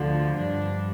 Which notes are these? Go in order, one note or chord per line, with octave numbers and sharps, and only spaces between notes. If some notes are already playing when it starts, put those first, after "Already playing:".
Already playing: D2 D3 F3
G2 F3 D4